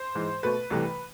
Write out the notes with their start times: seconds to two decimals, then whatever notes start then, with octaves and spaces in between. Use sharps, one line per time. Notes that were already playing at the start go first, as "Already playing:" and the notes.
Already playing: C5
0.15 G#2 E3 G#3
0.43 B2 A3 B4
0.70 C2 C3 E3 A3